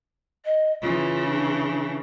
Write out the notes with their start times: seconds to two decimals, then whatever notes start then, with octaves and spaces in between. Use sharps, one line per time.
0.45 D#5
0.82 C#3 E3 F4
1.28 D4